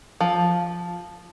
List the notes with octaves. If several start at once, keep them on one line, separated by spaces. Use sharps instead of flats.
F3